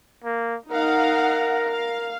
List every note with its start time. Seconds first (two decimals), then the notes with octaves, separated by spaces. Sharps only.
0.24 A#3
0.71 D#4 A#4 F5 F#5
1.72 F5